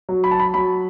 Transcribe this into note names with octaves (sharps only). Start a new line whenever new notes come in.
F#3
B5
A5
B5
F#3 B5